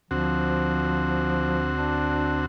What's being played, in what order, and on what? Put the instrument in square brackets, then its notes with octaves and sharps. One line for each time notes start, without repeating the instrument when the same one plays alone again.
[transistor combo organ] D2 C4 F#4 [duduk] F3
[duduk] D4